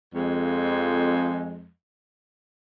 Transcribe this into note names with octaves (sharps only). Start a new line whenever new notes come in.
F2 G#3